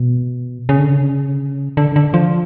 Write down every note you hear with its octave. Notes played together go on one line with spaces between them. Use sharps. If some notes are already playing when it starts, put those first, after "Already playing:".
Already playing: B2
C#3
D3
C#3
D3
D3
F3